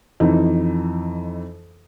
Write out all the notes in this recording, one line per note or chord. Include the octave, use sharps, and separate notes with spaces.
F2 E3 D#4